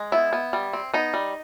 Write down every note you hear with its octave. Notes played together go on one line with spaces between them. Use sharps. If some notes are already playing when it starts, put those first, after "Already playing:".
Already playing: G#3
B3 E4
B3
G3
C4
B3 D#4
G3